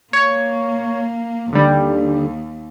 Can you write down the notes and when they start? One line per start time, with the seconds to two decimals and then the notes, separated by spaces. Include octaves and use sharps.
0.13 A#3 C#5
1.53 D#2 D3 G3